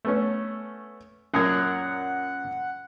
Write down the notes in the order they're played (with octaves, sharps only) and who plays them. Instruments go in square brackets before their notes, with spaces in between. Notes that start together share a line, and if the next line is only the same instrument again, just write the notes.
[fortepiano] A3 B3 C#4
[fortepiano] F#2 A#2 A#4 [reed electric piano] C#4 D#6 G#6 [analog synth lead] F#5